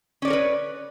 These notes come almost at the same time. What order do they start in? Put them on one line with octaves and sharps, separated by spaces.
C#4 D5 C#5 A#4 B4